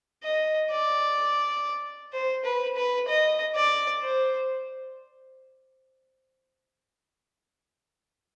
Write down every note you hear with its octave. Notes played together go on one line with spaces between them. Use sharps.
D#5
D5
C5
B4
B4
D#5
D5
C5